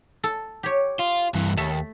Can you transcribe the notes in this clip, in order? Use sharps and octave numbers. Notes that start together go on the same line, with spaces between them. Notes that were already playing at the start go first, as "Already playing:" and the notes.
A4
G4 C#5
F4
G2 E3
D#2 A3